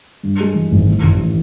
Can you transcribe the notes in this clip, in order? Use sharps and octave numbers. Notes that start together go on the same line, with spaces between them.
G2
G#3
E3
G#1
A2
A1
E3